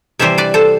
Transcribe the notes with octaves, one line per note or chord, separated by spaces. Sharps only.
C3 E3 G3 C5 E5
B4 D5
A4 C5